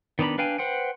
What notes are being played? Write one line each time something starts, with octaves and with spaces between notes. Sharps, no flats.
D#3 B3 D4 A#5 B5
D4 B4 F5 G5 G#5
B4 C5 F#5 G5